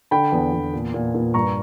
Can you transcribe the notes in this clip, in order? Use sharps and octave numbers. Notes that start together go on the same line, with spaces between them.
D3 G5 B5
E2
E2
A#2
A#2
A#2
G2 A#5 C#6